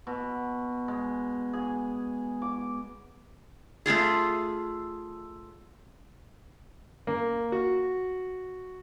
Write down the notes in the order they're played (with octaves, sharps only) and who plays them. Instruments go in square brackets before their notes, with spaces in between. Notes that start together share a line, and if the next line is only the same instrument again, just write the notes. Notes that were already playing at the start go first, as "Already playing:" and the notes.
[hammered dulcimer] B2
G#3
G#4
D6
[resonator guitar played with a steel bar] A3 E4 F4 G#4
[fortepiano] A#3
F#4